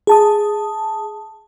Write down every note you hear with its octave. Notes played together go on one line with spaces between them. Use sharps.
G#4 A5 D#6